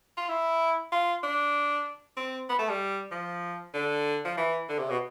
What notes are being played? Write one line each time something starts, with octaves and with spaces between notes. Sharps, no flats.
F4
E4
F4
D4
C4
B3
A3
G3
F3
D3
F3
E3
D3
C3
B2